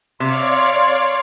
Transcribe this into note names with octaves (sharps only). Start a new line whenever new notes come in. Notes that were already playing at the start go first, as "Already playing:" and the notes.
C3 C#5 D5 F5 C6